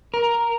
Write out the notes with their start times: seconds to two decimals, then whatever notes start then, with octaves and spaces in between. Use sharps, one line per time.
0.14 A#4